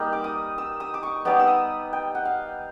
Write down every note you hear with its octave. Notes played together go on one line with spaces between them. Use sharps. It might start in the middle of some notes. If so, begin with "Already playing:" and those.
Already playing: G3 A#3 D#4
D6
D#6
E6
D#6
D6
C#6
G3 B3 D#4 D6
E6
D#6
G5
F#5
F5